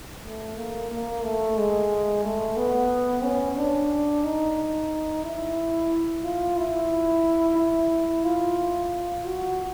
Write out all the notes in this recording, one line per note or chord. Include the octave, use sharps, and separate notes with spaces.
A3
A#3
A#3
A3
G#3
A3
B3
C#4
D4
D#4
E4
F4
E4
E4
F4
F#4